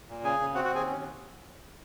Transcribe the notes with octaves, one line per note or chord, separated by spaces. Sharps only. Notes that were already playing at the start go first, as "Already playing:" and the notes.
A#2
C#3 G#4 G#5
C#3
C4 F#4 F#5
F#4 F#5
D#2
G#4 G#5
C#4